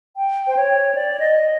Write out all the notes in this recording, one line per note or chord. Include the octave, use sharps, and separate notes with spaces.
G5
C5
C#5
D5
D#5